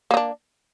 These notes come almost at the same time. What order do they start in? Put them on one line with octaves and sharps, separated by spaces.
A#3 D#4 D4